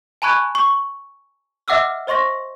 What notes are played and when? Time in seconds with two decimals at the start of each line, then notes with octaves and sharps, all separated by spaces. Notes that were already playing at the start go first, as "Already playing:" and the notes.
0.22 G#5 A5 B5 C#6 F#6 G#6
0.55 C#6
1.68 D#5 E5 F#5 D6 E6 F6
2.07 C5 D#5 C6 C#6 A#6